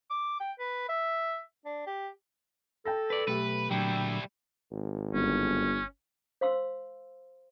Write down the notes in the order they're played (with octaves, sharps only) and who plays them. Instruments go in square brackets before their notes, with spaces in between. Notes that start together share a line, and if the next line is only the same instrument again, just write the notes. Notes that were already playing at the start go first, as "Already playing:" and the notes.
[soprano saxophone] D6
G5
B4
E5
D4
G4
[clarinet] A4 [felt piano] G5 A5 A#6
[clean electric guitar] B4 D5
[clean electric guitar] B1 [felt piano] A3 G4 [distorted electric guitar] B4
[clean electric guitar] A#2 D3 F#3 [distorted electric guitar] G3 E4 [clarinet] G5
[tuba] G#1
[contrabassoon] G1 [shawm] C#4
[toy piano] C5 F5 C6 E6